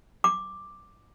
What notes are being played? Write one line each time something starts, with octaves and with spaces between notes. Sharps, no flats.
D6